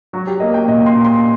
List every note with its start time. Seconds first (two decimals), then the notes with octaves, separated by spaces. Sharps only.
0.13 F#3 F#4
0.27 G4
0.40 A#3 D#5
0.54 G5
0.68 A#2 D#5
0.86 C6
0.95 A#2
1.04 C6